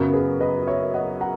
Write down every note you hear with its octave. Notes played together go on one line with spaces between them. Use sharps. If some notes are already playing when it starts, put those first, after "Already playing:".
Already playing: F#2 C#3 F#3 B3 A#4
G#4 B4
B4 D#5
C#5 E5
D#5 F#5
F#5 A#5